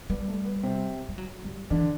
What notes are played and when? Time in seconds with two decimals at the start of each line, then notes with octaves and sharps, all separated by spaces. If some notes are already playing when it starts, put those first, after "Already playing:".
0.10 G3 B3
0.28 A3
0.45 B3
0.63 C3 C4
1.09 G3
1.18 F#3
1.44 G3
1.70 D3 E3 D4